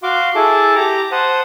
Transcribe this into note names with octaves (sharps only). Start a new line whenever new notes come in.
F#4 F5 C6 D6
E4 G#4 A4 A5 D6
G4 A#5 D6
C5 F#5 A5 D#6